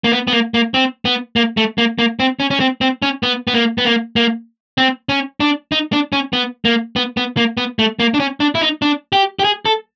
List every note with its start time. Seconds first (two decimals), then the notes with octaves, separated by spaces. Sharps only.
0.04 A#3
0.12 B3
0.28 B3
0.33 A#3
0.54 A#3
0.74 C4
1.05 B3
1.36 A#3
1.57 A3
1.78 A#3
1.99 A#3
2.20 C4
2.40 C#4
2.51 C#4
2.60 C4
2.81 C4
3.02 C#4
3.23 B3
3.47 B3
3.54 A#3
3.78 B3
3.85 A#3
4.16 A#3
4.78 C4
5.09 C#4
5.40 D4
5.72 D#4
5.93 D4
6.13 C#4
6.33 B3
6.65 A#3
6.96 B3
7.17 B3
7.37 A#3
7.57 B3
7.79 A3
8.00 A#3
8.14 D4
8.20 C#4
8.40 D4
8.55 E4
8.62 D#4
8.82 D4
9.13 G4
9.39 G4
9.44 G#4
9.65 A4